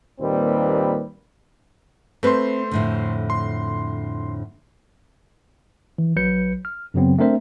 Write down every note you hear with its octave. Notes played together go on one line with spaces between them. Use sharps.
D#2 A#2 G3 C4 B4
A3 C4 B4 C5 C6
F2 A2 D3
C6
E3
A#1 F#3 B4 G6 C#7
F6
F#2 C#3 F#3 B3 C4
A3 C4 D4 A#4 C5 E5